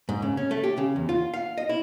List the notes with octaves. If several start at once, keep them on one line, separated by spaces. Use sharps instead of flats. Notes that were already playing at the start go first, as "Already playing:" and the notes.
G#2
C#3
C#4
A3
G4
C#3
E2
F4
F5
D#5
E4